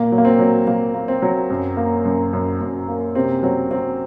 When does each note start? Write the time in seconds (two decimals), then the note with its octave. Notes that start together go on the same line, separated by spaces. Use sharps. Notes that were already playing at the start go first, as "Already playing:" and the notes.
Already playing: A#2 A#3
0.12 F#3
0.18 A#3
0.25 C4
0.39 F#3
0.67 F#3 A#3
0.94 A#3
1.08 C4
1.22 F#3
1.50 F#2
1.77 A#3
2.05 F#2
2.33 F#2
2.61 F#2
2.88 A#3
3.15 C3 C4
3.43 F#3 C4
3.71 F#3 C4